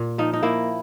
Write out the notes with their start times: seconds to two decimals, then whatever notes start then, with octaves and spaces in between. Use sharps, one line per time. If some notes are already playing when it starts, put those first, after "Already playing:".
Already playing: A#2
0.18 F3 D#4
0.33 D#4
0.43 A#3 E4